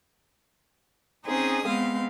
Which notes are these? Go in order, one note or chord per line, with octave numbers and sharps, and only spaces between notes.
C4 C#4 D#4 G#4 D#6
G#3 B3 C4 F5